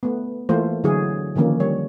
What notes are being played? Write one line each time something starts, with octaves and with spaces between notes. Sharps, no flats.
A3 B3
E3 A3 A#3 F4 C5
D3 F#3 E4 F#4 G#4
D3 D#3 F3 A#3 C#4
G3 C#5